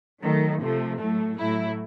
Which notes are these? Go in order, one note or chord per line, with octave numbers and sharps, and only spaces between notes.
D#3 F#3 A3
C3 F3 A3
A2 F#3 A3
A2 F#3 A3 E4